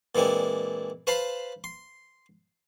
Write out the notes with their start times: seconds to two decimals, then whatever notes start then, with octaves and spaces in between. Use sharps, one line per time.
0.15 A#2 E3 G#3 C4 D4
1.07 B4 C5 F5 A5 B5 C6
1.64 C6